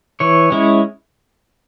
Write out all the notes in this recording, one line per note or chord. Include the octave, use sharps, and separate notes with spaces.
E3 C#5
G#3 C#4 E4